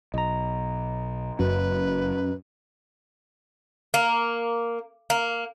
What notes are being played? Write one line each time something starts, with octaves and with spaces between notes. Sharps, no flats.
B1 D#5 A#5
F#1 F#2 F#3 B4
A#3
A#3